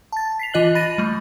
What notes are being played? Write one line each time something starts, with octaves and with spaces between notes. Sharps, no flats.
A5 A6
B6 C7 F7
E3 F4 D#5 F#6 F#7
B5 A6 A#6 D#7
G3 A3